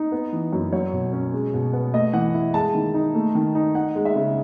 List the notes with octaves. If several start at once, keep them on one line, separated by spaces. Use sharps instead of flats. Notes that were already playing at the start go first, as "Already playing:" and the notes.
Already playing: D#4
B3
E3
F#2
F#3 C#5
B2
C#4
G#3
B2
B3
A3 D#5
E3 F#5
E4
G#3 A5
D#3
D#4
A3
D#3
D#4
D#4 F#5
G#3
E5
C#3